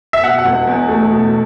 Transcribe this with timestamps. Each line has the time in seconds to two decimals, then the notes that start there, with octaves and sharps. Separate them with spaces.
0.13 E5
0.23 B2 F#5
0.38 F#5
0.45 E1
0.67 E2
0.89 A3
1.10 B2